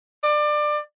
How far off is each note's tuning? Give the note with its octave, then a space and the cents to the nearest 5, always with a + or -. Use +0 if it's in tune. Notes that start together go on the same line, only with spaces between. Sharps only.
D5 +25